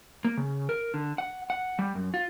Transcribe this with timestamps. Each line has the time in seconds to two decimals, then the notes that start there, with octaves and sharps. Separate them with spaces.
0.25 A#3
0.37 C#3
0.69 A#4
0.94 D3
1.18 F#5
1.50 F#5
1.79 G3
1.95 F#2
2.14 F4